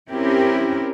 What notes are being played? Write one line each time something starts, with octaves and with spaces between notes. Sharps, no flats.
C4 C#4 E4 G4 A#4